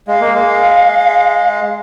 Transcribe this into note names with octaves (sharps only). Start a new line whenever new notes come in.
G#3 F5
A#3
G#3